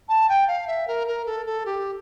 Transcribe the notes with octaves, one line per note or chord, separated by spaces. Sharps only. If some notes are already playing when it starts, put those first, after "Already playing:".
A5
G5
F5
E5
A#4
A#4
A4
A4
G4